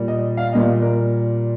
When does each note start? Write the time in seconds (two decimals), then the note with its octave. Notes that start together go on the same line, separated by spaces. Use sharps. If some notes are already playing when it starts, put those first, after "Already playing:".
Already playing: A#2 G3
0.08 D#5
0.37 F5
0.53 A#2 G3 D#5
0.82 A#4